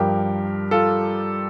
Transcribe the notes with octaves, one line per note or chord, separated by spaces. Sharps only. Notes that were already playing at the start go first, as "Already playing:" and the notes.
Already playing: G2 F3 G4 A#4
F4 A4